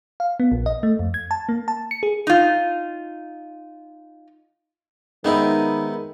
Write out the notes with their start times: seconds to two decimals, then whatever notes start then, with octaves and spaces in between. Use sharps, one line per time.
0.20 F5
0.40 B3
0.52 A#1
0.66 D#5
0.83 A3
0.99 F2
1.14 G#6
1.31 A5
1.49 A#3
1.68 A5
1.91 C#7
2.03 G#4
2.27 D#4 F4
5.25 D#3 G#3 B3 C4 D#4 E4 A#4